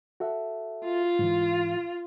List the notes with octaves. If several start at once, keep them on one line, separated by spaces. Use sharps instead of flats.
F#4 A4 E5
F4
G#2 E3